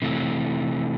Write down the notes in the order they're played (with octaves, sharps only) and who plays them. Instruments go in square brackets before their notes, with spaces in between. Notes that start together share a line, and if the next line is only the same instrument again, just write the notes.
[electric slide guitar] C3 E3 A3